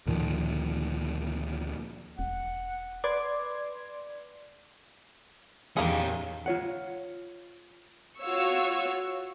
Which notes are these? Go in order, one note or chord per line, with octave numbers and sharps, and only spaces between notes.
D2 A#2 D#3 F3
E1 F#5
B4 D5 C6 D6 G#6
E2 D#3 A#3 C#4 G4 G#4
F4 C#5 F#5
F4 F#4 C#5 F5 C#6 E6